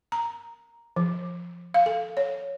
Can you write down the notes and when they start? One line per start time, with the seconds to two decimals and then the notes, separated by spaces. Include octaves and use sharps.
0.12 A#5
0.96 F3
1.74 F5
1.86 A4
2.17 C#5